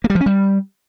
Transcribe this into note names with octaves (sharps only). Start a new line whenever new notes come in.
A#3
G3
F3
C#4
G3